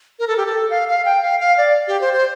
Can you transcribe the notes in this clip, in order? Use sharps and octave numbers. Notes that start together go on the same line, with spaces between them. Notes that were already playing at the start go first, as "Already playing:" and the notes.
A#4
A4
G4
A4
F5
F5
G5
F5
F5
D5
G4
C5
C5